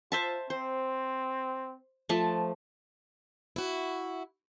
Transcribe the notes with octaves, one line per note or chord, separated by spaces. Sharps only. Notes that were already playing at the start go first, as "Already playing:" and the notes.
F4 C5 E5 A5
C4 C5
F3 A3 A5
E4 F#4